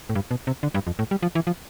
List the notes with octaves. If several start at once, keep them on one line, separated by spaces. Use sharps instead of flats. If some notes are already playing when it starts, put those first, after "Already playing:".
A2
G2
B2
C3
D3
G2
F2
A2
G3
F3
E3
F3